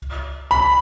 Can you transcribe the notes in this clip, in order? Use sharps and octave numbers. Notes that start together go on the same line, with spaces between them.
B5